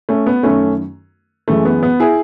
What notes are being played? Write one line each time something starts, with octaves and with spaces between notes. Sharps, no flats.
A3 C#4
B3
F#2 D#3 A3 C#4
F#2 E3 G#3 A3
B3
B3
E4 G#4